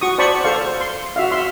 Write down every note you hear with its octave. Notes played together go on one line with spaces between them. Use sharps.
F#4 C#6 D#6
C5 D5 A5 B5 C#6
A4 C5 F5 C#6
C6
F#4 E5 F5
E5 F5 C6